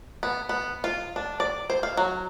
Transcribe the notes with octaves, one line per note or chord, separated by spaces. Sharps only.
B3
B3
F4
D4
D5
C5
F5
F#3